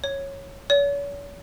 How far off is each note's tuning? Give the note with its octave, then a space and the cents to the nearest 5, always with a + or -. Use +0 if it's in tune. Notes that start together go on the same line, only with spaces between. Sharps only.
C#5 -10
C#5 +40